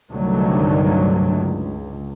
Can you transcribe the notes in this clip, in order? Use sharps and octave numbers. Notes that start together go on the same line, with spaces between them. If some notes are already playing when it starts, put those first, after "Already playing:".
C2 G2 D3 D#3 F#3 A3
C#2